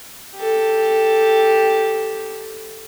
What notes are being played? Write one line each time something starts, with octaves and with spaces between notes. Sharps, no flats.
G4 A4